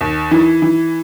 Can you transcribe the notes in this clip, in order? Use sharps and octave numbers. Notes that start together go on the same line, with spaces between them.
D#2
E3
E3